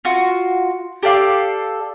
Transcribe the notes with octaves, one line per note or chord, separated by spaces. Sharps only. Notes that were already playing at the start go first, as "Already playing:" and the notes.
F4 F#4
G4 A4 D5 F5